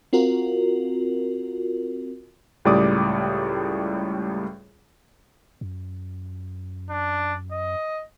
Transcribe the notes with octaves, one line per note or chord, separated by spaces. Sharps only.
C4 F4 F#4 A#4
C#2 A2 G3 D5 D6 D#6
F#2
D4
D#5